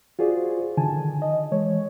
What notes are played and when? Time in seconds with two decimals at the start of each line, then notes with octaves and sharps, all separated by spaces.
0.19 F4 F#4 G#4 C5 D5
0.77 D3 D#3 G#5 A5
1.22 D#5
1.52 E3 G#3 C#5